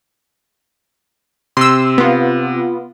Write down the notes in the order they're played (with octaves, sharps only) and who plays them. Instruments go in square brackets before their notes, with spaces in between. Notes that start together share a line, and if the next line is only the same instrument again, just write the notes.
[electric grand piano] C3 [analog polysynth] C6 E6
[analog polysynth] B3 F4